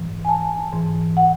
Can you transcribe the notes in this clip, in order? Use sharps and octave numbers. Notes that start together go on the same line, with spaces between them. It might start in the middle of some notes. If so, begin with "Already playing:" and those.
Already playing: G#2 E3
G#5
A5
G#2 E3
F#5